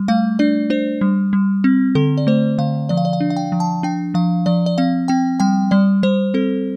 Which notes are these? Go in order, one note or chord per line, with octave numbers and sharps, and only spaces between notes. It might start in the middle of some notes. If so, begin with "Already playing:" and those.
Already playing: G3
A3 F5
D4 D5
D4 C5
G3
G3
C4
D3 A4
D5
A3 C5
D3 F5
F3 D5
F5
D5
F5
D4
F5
G5
F3
A5
D4 G5
F3 F5
F3 D5
D5
C4 F5
C4 G5
G3 G5
G3 D5
G3 C5
C4 A4